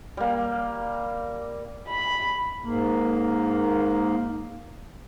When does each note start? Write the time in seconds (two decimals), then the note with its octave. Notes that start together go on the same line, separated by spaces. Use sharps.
0.17 G3 A#3
1.88 B5
2.64 G#2 A#3